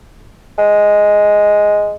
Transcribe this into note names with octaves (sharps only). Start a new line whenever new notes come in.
G#3